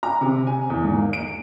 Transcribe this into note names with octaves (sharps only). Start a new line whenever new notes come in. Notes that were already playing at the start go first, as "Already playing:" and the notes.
A#5
C3
G#5
E2
G#2
A#3
D7